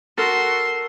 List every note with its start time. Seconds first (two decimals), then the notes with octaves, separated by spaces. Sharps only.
0.17 F#4 A4 A#4 C6 E6